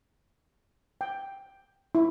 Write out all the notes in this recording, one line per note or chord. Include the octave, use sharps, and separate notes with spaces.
G5
E4